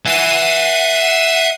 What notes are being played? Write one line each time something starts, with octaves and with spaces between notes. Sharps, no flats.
E5 F#5 G#5 C7 D#7